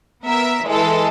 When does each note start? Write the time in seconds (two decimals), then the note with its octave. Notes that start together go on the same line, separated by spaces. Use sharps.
0.24 B3 A#4 E5
0.65 E3 G#3 A4